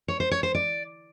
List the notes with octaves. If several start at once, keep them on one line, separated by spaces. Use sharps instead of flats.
C#5
C5
C#5
C5
D5